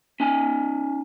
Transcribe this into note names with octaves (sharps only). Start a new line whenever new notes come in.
C#4 D#4 G#5